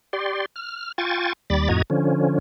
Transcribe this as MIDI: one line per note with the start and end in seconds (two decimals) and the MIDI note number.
0.13 0.46 67
0.13 0.46 74
0.13 0.46 84
0.56 0.92 89
0.98 1.33 65
0.98 1.33 79
0.98 1.33 80
0.98 1.33 85
0.98 1.33 93
1.50 1.69 39
1.50 1.69 55
1.50 1.69 83
1.50 1.69 86
1.50 1.69 93
1.69 1.82 41
1.69 1.82 45
1.69 1.82 66
1.69 1.82 75
1.69 1.82 82
1.69 1.82 92
1.90 2.39 50
1.90 2.39 53
1.90 2.39 61